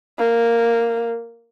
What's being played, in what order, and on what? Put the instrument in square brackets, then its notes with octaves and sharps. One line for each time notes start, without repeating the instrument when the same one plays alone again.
[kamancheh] A#3